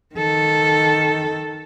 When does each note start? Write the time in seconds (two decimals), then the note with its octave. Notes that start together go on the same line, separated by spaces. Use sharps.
0.15 D#3 A4